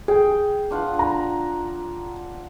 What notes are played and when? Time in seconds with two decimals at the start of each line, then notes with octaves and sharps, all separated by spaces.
0.08 G#4 G5
0.71 D4 F4 F#5
0.99 A#5